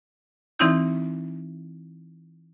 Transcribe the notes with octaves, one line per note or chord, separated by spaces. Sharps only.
E3 C4 D#4 E4 G6